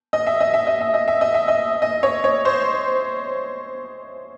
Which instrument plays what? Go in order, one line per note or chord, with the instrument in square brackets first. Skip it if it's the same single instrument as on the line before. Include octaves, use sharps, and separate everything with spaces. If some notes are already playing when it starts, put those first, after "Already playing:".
[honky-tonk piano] D#5
E5
D#5
E5
D#5
E5
D#5
E5
D#5
E5
D#5
D#5
C#5
C#5
C5